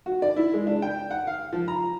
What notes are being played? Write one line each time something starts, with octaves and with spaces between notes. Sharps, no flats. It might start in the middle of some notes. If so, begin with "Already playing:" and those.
F#4
D5
E4
G#3
D4
G5
F#5
F5
F3
A#5